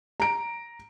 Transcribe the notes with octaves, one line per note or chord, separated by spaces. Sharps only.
A#5 D7